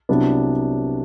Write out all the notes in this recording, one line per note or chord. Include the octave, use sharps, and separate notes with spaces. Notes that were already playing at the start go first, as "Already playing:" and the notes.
C2 C3 F#3 B3 D4